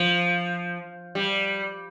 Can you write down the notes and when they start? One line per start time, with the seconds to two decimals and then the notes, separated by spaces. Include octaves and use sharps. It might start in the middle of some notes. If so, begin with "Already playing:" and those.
Already playing: F3
1.15 G3